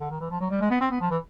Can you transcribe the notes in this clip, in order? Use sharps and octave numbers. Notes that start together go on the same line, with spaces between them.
D3
D#3
E3
F3
F#3
G3
G#3
B3
C4
B3
F3
E3